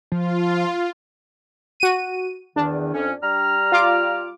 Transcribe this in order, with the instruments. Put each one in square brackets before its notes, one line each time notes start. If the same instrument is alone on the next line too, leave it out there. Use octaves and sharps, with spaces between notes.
[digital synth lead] F3 [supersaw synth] F4
[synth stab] F#4 D#7
[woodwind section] E2 D#3 [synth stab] D4
[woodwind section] F2 C#4
G3 A#5 F6
[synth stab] F4 D6